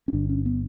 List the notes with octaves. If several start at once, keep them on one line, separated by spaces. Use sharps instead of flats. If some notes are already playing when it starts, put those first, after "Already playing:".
C#4
G1 G2 D3 D4
C#4
B3